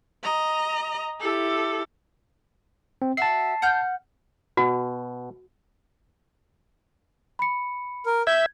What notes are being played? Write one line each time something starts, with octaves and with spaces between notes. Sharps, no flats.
D#5 A#5
E4 G4 A4
C4
F#4 E5 A5 C7
F#5 F6 G6
B2 F#4
B5 C#7
A#4
E5 G6 G#6